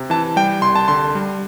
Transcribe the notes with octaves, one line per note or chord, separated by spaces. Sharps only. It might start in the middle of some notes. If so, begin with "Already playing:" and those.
Already playing: C3
E3 A5
G3 G5
C2 C6
A5
D3 C6
G3